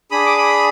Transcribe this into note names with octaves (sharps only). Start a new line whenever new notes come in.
D4 G#4 B5 D#6
D6
B5 D#6